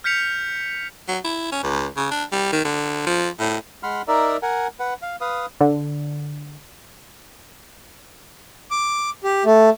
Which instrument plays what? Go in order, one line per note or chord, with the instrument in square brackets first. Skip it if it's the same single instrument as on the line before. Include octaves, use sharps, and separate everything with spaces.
[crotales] F6 G6 B6 C#7 F7
[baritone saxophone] F#3
E4
C#4
C#2
C#3
D4
G3
D#3
D3
F3
A2
[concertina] G#3 F#5 B5 C6 F6
D#4 A#4 D5 E5
A#4 F#5 G#5
B4 F#5
F5
B4 F5 D#6
[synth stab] D3
[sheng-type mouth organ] D6
G4
A3